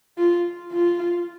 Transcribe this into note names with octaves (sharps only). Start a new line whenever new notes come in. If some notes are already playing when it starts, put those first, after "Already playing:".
F4
F4